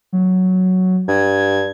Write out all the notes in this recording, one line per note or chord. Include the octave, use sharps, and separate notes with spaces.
F#3
G2 G#6